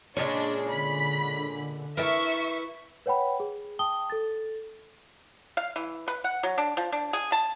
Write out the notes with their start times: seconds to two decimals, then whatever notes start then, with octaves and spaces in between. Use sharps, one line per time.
0.17 A#2 C#3 G#3 D4 C#5
0.70 D3 B5 B6
1.97 E4 A#4 B4 E5 A5 C#6
3.06 B4 C#5 F#5 G5 B5
3.40 G#4
3.79 G5 A5 D#6 G7
4.10 A4 A6
5.57 F5
5.76 E3
6.08 B4
6.24 F#5
6.43 F#3
6.58 D4
6.77 F3
6.92 D4
7.13 G#4
7.32 A5